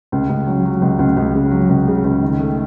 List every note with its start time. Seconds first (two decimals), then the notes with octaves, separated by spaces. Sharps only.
0.12 C#2
0.29 C#2
0.47 F#3
0.65 F#3
0.82 C#2
0.99 C#2
1.17 C#2
1.35 C#3
1.51 F#3
1.69 C#2
1.88 C#3
2.04 C#2
2.22 D#3
2.39 A3